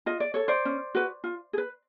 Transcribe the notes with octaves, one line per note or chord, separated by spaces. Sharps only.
F4 D#5
D5
A4 C#5
C5 D5
C#4
F#4 B4
F4
G#4
B4